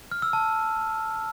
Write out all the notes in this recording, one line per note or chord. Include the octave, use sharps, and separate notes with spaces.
F6
E6
A5